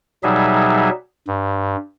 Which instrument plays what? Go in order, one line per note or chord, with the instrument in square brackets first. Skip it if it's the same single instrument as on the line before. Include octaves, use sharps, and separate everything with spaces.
[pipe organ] B2 F#3 G3 D#4 G#4 E5
G2